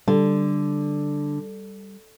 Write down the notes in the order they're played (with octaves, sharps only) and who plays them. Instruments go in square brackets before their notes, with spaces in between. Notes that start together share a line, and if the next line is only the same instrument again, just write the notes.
[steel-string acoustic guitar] D3 [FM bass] G3